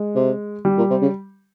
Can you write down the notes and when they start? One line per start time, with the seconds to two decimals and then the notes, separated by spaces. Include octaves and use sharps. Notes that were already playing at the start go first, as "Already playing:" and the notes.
Already playing: G#3
0.15 C3
0.65 G3
0.78 A#2
0.90 C3
1.02 C#3